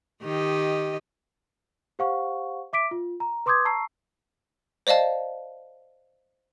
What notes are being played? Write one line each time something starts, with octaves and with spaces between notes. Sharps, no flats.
D#3 G4 D#5
G4 C5 F5 F#5 C#6
E5 D6 B6 D7
F4
A#5
B4 C6 D6 D#6 G6 G#6
A5 A#5 C#6 E6 C7
C5 D5 D#5 F5 A5